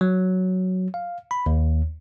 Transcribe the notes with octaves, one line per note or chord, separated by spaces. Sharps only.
F#3
F5
B5
D#2